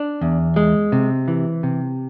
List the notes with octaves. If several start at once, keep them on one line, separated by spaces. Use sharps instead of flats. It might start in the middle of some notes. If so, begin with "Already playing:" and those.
Already playing: D4
E2
G#3
C3
E3
C3